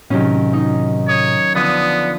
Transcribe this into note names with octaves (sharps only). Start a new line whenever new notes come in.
A2 C3 D#3 F#3 C#4
D#4
C#5 D#6
D3 F3 B3 D5 D#6